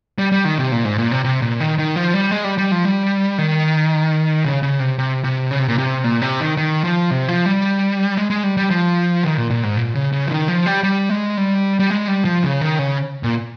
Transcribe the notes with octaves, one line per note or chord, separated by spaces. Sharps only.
G3
G3
D#3
C3
A#2
G#2
A#2
C3
C3
A#2
D#3
D#3
F3
G3
G#3
G3
G3
F3
G3
D#3
C#3
C#3
C3
C3
C3
C#3
C3
A#2
C3
A#2
C3
D#3
D#3
F3
C3
F3
G3
G#3
G#3
G3
G3
F3
D#3
A#2
A#2
G#2
A#2
C#3
C#3
F3
D#3
F3
G3
G3
G#3
G3
G3
G#3
G3
F3
C#3
D#3
C#3
A#2